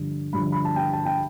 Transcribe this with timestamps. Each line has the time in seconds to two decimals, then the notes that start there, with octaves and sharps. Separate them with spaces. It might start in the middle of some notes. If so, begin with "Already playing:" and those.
Already playing: G2 D3 F3
0.33 G2 D3 F3 B5
0.52 B5
0.65 A5
0.76 G5
0.93 A5
1.05 G5